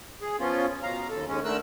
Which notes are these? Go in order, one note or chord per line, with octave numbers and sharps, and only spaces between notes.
G#4
F3 B3 C#4 F4
B2 F5 A#5
D#2 A4
D#2 G#3 C#4
D3 A3 A#4 E6 F#6